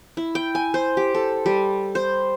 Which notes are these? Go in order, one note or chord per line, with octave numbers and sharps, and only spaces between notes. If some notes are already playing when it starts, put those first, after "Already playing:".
E4
G5
G#5
C5
G4
A4
G3
C5